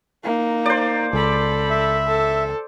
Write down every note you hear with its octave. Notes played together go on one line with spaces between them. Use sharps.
A#3 D#4
C5 D5
C#2 A4 B5
E5
A4